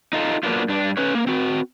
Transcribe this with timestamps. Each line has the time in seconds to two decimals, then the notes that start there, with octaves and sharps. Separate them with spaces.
0.13 D#4 F4 A4
0.43 F#3 A#3 B3 D4 F4
0.69 G2 D4
0.97 C#4 B4 C#5
1.15 A#3
1.27 C4 F#4